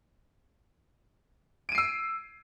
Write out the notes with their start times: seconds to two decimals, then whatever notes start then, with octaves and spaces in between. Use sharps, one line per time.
1.69 D7
1.72 D#7
1.75 C7
1.78 E6